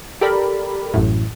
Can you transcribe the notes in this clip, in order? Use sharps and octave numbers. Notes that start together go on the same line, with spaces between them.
G4 A4 A#4 D5 B5
A1 F#2 A2